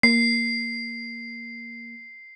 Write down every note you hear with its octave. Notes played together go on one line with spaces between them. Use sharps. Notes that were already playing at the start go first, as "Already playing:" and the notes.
A#3 C7